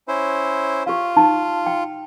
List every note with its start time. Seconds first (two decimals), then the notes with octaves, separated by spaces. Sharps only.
0.08 C#4 E4 C5
0.86 F4 G4 F5
1.16 D#4 A5 C6
1.66 G5